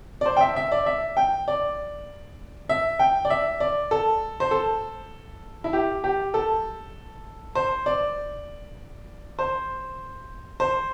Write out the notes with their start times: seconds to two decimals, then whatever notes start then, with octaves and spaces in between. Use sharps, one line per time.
0.21 D5
0.26 C5
0.37 G5
0.41 E5
0.56 E5
0.72 D5
0.86 E5
1.17 G5
1.48 D5
2.69 E5
2.99 G5
3.25 D5
3.30 E5
3.60 D5
3.91 A4
4.40 C5
4.51 A4
5.64 E4
5.73 G4
6.04 G4
6.34 A4
7.55 C5
7.86 D5
9.39 C5
10.60 C5